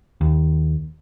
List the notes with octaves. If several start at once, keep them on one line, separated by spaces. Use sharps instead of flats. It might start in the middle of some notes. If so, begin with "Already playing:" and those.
D#2